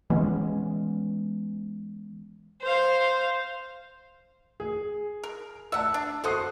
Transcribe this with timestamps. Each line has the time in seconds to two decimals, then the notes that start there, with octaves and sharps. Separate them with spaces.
0.10 E3 G#3 B3 C#4
2.62 C5 F5
4.60 G#4
5.24 A#4
5.72 D5 E5 F#5 A5
5.94 D4
6.24 F#4 A4 C5 F#5 D#6 C7